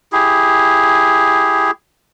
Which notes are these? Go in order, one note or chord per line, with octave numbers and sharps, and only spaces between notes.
E4 G4 G#4